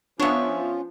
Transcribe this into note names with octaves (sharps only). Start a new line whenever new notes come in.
F3 B3 C#4 D4 F4 C#5 E5